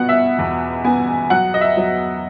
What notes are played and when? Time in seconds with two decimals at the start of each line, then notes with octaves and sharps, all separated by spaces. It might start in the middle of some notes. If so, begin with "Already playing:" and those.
Already playing: B2 B3 F#5
0.09 E5
0.39 E2
0.84 B3 G#5
1.30 F#3 F#5
1.54 D#5
1.61 E5
1.77 F#3